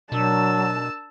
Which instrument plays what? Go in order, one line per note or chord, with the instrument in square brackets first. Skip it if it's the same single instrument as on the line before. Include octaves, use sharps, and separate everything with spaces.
[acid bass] B2 [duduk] F#3 [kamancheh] D4 A#4 [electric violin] A5 E6